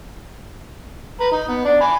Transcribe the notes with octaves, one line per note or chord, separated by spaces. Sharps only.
B4 A#5
D#4
B3
D4 D5
G#5 B5